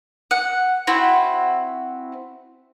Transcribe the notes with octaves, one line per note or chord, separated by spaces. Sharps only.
F#5
C4 E4 F#4